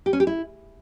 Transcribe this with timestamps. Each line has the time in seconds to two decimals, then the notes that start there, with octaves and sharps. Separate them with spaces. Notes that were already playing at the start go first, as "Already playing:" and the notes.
0.06 G4
0.13 C#4
0.20 G4
0.27 E4